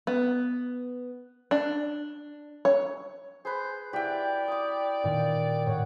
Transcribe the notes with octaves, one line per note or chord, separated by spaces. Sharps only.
B3
D4
C#5
G#4 B4 C5
E4 F#4 G4 D5 G5
D6 D#6
A#2 D#3
A2 C#5 F#5